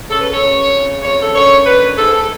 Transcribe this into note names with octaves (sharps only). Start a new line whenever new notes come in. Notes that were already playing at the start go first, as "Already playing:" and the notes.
F#2 C#3 A4
B4
C#5
F#2 C#3
F2 C#3
F2 C#3 C#5
A4
F#2 D3 C#5
F#2 D3 B4
G#2 A4
A4